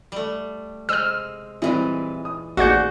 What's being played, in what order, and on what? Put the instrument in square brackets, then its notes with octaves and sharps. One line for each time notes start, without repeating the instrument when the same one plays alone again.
[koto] G3 A3
[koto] C3 G#3 [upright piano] C5 [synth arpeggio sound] E6 F6
[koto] A#2 E3 G#3 [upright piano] G3 C4 E4
[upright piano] D#6
[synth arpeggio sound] A1 D5 G6 [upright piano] D#2 G#4 C#7 [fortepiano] F#4 [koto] C5